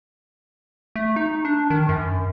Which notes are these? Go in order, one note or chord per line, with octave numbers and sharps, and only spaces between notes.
A3
D#4
D4
D#3
F#2